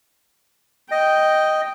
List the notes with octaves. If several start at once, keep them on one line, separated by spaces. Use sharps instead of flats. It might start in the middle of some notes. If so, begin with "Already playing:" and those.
D#5 G5